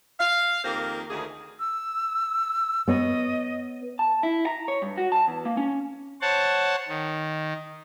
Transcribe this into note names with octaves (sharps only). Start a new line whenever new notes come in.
F5
F2 D#3 A#3 G4 A#4 C5
D2 D#3 G#4
E6
B3 C#5 D#5
A5
E4
A#5
C#5
G2
F#4
A5
E2
A#3
C#4
C5 C#5 F#5 A5
D#3